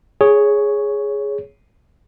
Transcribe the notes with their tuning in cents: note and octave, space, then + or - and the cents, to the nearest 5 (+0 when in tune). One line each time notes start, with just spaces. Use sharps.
G#4 +0 C#5 +0